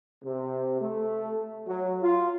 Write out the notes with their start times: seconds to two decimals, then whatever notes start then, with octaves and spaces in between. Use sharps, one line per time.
0.24 C3
0.81 A3
1.67 F#3
2.02 F4